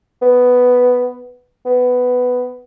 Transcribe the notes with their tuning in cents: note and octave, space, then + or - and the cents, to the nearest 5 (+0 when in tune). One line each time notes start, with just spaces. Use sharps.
B3 +5
B3 +10